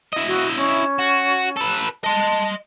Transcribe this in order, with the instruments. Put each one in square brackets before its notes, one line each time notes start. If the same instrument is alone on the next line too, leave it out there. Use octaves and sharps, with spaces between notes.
[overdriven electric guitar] E4 D#5
[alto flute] F#4
C#4
[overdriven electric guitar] F#4
A4 B4
[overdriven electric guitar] D#5 C6 [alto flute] A5